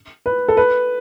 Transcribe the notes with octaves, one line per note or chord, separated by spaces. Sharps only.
B4
A4
B4